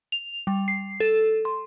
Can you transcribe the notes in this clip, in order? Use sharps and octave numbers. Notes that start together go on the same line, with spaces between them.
F7
G3
C7
A4
C6